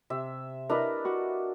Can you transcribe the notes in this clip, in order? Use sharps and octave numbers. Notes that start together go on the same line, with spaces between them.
C3 E5
D4 E4 A#4 B4 D#5
F#4